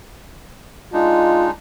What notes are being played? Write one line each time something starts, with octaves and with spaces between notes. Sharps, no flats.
G#3 D4 D#4 F4